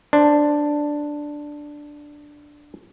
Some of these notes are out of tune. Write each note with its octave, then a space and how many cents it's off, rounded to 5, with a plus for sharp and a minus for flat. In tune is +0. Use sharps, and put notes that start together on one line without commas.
D4 +0 C5 +0